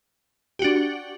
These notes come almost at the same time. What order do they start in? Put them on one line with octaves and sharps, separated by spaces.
G4 F#4 D4